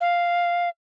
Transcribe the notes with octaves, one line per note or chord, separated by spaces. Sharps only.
F5